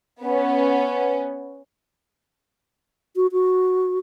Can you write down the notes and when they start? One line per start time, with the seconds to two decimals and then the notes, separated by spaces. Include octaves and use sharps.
0.22 B3 C#4
3.16 F#4
3.32 F#4